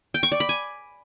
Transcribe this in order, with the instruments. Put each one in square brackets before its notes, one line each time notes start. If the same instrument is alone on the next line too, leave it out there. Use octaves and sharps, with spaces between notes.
[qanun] G5
C#6
D5
B5
G#5